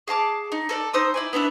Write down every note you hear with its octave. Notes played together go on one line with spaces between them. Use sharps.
G#4 F5 A5 D6
D#4
A4 A#4 D5
D#4 C5 D#6 E6
E4 D5 G#5
B3 D4 E4 E5